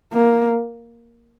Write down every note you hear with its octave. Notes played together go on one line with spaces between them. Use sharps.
A#3